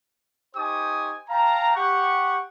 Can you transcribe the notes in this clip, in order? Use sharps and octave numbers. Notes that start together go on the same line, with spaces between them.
D#4 G4 C5 G#5 C#6 D#6
F5 G5 A5 A#5
G4 F#5 C#6